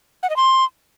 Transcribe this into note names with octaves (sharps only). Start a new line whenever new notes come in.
F#5
D#5
C6